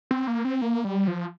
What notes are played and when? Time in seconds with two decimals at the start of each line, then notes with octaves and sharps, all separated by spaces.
0.11 C4
0.27 A#3
0.45 C4
0.62 A#3
0.84 G3
1.07 F3